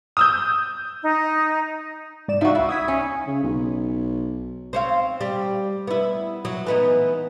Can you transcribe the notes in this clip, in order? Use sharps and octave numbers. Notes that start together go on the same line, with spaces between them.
D#6 E6 G6
D#4
G#2 D5 E7
F3 D#4 F#4 E5
C#2 E4 E5
D#6 G#6 B6
C#4
C#3
B1
C4 C#5 F5
G3
B3 E4
F#3
E3 B3 D#4